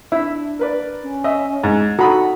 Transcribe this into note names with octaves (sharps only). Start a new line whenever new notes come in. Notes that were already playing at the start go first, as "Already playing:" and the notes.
D4 E4 E5
A#4 B4 D5
C#4
D#5 E5
G#2
D#4 F#4 A4 A#5 B5 D#6